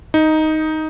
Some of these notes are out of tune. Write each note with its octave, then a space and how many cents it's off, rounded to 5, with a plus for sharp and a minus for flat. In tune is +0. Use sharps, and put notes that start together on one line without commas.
D#4 +5